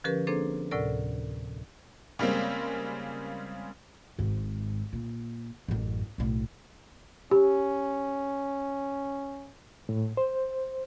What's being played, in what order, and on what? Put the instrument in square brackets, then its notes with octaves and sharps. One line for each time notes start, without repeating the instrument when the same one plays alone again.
[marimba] D3 F3 C#4 G4 A#4 B4
A#3 C4 D4 G#4 A4 C5
D2 A2 C3 A4 A#4 D5
[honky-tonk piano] C#3 G3 G#3 A#3 C4
[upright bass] G#1 G#2
A#2
A1 F#2
B1 A2
[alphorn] C#4 [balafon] G4
[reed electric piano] A2
C5